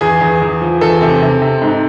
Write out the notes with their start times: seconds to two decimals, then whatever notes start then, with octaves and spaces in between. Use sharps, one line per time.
0.01 E2 G#4
0.21 E2
0.41 E2
0.61 F3
0.81 E2 A4
1.01 C3
1.22 C3
1.41 C3
1.62 G#2